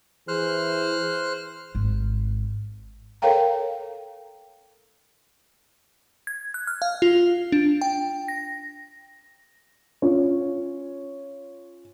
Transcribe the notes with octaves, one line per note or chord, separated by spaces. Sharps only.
E3 E4 G#4 C5 F6 F#6
G#1
A4 A#4 C#5 F5 G5 A#5
G#6
F#6
F6
F5
F4
D4
G5
A#6
C#4 F4 C#5